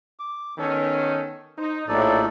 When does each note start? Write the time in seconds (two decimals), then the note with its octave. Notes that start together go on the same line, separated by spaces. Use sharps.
0.19 D6
0.58 D#3 B3 C#4 A4
1.58 D#4 C5
1.88 A#1 A2 D#4 A4 D5